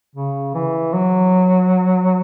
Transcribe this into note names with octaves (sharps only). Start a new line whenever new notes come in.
C#3
E3
F#3